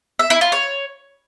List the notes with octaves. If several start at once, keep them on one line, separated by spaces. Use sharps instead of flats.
E5
E4
F4
C#5